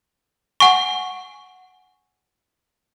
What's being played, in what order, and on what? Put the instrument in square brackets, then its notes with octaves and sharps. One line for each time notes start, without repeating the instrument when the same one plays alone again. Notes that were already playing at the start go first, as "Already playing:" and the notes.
[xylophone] F#5 G#5 C#6